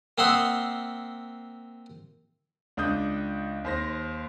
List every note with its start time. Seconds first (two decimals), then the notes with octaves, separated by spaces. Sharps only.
0.18 A#3 C4 E5 F#5 C6 D#6
2.77 C#2 D4 D5 D#6 G6
3.64 D#2 C5 A#6